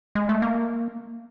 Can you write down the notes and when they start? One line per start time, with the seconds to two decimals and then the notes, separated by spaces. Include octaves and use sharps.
0.15 G#3
0.29 A3
0.42 A#3